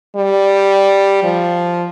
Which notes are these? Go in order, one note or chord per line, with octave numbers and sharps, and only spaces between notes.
G3
F3